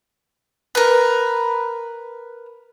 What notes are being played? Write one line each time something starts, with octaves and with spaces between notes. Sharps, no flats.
A#4 B4